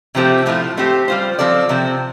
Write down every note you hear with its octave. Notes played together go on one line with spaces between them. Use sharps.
C3 F3 A3 C4 G4
A2 F3 A3 F4
A3 C4 G4 C5
G3 F4 C5
F3 C4 A4 D5
C3 F3 C4